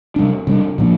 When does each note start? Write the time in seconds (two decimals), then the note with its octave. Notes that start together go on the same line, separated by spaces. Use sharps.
0.16 C3 G3 D4
0.47 C3 G3 D4
0.78 A#2 F3 A#3 D4